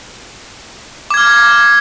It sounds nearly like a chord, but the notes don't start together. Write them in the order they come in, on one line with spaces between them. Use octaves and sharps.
D6 G#6 F6